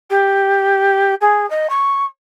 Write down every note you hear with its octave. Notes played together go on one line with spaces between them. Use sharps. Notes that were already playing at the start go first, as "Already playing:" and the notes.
G4
G#4
D#5
C#6